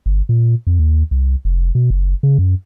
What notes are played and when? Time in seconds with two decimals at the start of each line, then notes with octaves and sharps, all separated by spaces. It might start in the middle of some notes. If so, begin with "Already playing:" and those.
0.06 G1
0.29 A#2
0.67 F2
0.79 D#2
1.11 C2
1.45 F1
1.75 B2
1.90 F#1
2.23 C#3
2.39 F#2